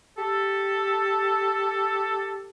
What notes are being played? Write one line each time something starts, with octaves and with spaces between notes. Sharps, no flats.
G4 A4